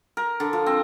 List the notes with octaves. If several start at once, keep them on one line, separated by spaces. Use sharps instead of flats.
A#4
D3
F3
C4